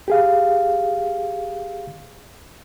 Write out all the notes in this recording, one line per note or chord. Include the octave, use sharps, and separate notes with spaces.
G4 G#4 F5